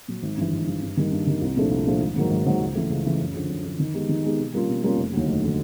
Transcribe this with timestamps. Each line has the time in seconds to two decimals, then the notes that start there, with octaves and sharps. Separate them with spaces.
0.08 A#2 F#3
0.23 G#1
0.37 G2 E3
0.52 G#1
0.67 G2 E3
0.82 G2
0.97 D#3 G3 A#3
1.12 G2
1.27 D#3 G3 A#3
1.42 C2
1.56 A#2 F3 A3 D4
1.71 C2
1.87 A#2 F3 A3 D4
2.00 G#1
2.16 G#2 D#3 F#3 A#3
2.31 G#1
2.46 G#2 D#3 F#3 A#3
2.60 C#2
2.75 C#3 E3 A3
2.90 C#2
3.05 C#3 E3 A3
3.20 F#2
3.34 D3 F3
3.49 F#2
3.64 D3 F3
3.79 D#3
3.94 G#3 B3 D#4 G4
4.09 D#3
4.24 G#3 B3 D#4 G4
4.39 B2
4.53 G3 A#3 C#4 F4
4.69 B2
4.83 G3 A#3 C#4 F4
4.97 F1
5.13 D#2 D3 F#3
5.28 F1
5.44 D3 F#3